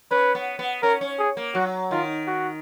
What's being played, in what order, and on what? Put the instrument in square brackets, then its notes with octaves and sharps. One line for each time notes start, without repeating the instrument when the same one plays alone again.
[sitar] C#4 [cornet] B4
[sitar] B3
B3
[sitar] C#4 [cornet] A#4
[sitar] C#4
[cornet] G#4
[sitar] A#3
[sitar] F#3 [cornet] F#4
[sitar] D#3 [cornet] F4
[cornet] F#4